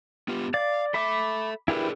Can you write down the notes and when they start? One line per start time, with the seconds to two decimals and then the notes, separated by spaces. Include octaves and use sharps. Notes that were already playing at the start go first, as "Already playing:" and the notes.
0.28 B3 F4 G4
0.54 D5 F5
0.94 A4 E5 B5 D6
1.68 D4 E4 G4 G#4 A#4 B4